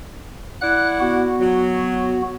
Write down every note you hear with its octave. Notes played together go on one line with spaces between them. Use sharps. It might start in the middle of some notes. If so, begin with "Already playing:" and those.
E4 D5 F#5 F#6
B3 F#4
F#3